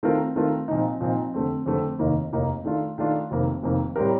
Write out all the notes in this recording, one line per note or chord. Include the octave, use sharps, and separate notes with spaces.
D#3 A3 C4 F4 A#4
D#3 A3 C4 F4 A#4
A#2 F3 C4 D#4
A#2 F3 C4 D#4
F2 D3 A3 C4
F2 D3 A3 C4
F1 D#2 D#3 A#3 D#4
F1 D#2 D#3 A#3 D#4
D#3 A3 D4 F4
D#3 A3 D4 F4
F1 F2 D#3 A#3
F1 F2 D#3 A#3
A2 G3 C4 G4 A#4